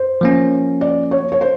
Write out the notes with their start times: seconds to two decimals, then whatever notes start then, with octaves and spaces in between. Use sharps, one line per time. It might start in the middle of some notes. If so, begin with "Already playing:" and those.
Already playing: C5
0.21 F3 A#3 C#4
0.81 D5
1.11 C#5
1.32 C#5
1.41 C5